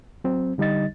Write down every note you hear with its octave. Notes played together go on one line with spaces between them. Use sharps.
F#3 C4
D3 G3 D#4 D#5 A6